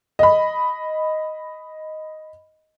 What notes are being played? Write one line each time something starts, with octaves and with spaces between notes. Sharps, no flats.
D#5 B5